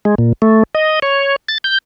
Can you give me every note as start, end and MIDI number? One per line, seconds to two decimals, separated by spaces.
0.05 0.15 56
0.18 0.33 46
0.42 0.63 57
0.75 0.99 75
1.02 1.36 73
1.49 1.58 93
1.64 1.78 91